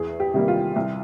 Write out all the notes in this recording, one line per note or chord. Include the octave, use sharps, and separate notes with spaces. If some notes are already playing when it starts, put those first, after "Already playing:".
Already playing: E2 G#4
G4
C3 D#3 G3 A#3
F4
C2